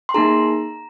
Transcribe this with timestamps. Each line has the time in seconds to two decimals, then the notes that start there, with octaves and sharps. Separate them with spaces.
0.09 C6
0.14 A#3 D#4 G#4 A#5